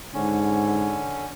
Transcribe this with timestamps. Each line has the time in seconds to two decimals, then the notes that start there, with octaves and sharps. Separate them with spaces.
0.14 G#2 D3 C#4